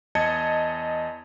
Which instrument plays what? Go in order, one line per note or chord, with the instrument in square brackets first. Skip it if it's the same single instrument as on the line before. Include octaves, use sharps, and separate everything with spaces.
[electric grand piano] E2 D#5 A5 G#6 C#7